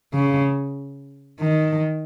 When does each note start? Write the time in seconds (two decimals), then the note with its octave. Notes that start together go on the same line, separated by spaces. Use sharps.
0.14 C#3
1.40 D#3